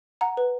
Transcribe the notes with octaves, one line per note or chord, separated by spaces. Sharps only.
F#5 A#5
B4